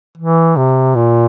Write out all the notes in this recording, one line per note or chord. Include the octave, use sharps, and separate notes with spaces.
E3
C3
A#2